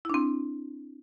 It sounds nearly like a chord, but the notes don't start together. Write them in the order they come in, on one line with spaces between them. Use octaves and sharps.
E4 D4 C4